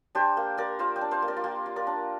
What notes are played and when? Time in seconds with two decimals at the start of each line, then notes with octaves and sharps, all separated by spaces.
0.15 D4 G4 C5
0.37 A#3
0.57 A#3 A#4 D5
0.79 F4 C5 F5
0.96 D5 G5
1.01 D4
1.11 C5 F5
1.22 A#3
1.28 A#4 D5
1.37 F4
1.44 A#3 G4
1.66 F4
1.76 A#4 D5
1.87 D4